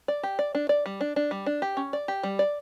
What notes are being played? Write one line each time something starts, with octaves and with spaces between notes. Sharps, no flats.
D5
G4
D5
D4
D5
G3
D4
D4
G3
D4
G4
C#4
D5
G4
G3
D5